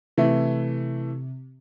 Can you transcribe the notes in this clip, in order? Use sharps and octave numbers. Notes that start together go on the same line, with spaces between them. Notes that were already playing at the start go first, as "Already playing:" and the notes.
C3 E3 A3